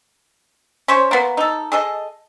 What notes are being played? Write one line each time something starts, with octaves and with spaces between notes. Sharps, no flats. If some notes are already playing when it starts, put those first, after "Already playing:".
C#4 C5 C#5
A#3 B3
D#4 A4
G#4 A4 D#5